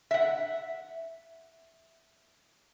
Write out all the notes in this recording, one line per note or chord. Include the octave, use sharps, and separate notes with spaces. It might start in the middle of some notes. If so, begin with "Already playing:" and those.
E5 F#5